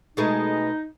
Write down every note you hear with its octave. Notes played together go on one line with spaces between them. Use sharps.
B2 G#3 A3 D#4